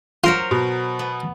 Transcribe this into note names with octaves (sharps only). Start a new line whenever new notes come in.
F#3 F4 A#4 C5
B2
B3